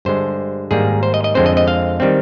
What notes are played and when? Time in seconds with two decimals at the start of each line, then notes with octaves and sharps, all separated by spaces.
0.05 G2 D3 G#3 C5
0.71 G#2 D#3 G3 A#3 G#4
1.03 C5
1.14 D#5
1.24 D#5
1.35 F2 D3 G#3 C4 C5
1.46 D#5
1.57 D#5
1.68 F5
2.00 D#3 G3 C4